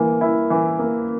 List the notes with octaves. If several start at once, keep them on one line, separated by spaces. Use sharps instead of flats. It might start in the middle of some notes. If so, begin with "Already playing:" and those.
Already playing: E3 A#3
E4
E3
A#3